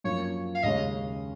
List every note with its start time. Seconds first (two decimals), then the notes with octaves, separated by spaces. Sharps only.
0.04 F#2 F3 A#3 C#5
0.55 F5
0.63 D#2 C#3 G#3 C#4 D#5